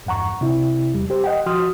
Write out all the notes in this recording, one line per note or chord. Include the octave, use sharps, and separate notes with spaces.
E2 G2 F#5 A#5 C#6
C3 E4
E2 G3
G4 C5
D#5 F#5 G5
F3 F#4 C6 D#6 F6